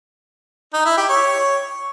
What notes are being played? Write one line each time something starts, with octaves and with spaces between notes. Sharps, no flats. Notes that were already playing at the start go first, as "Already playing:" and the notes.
D#4
E4
G4
C#5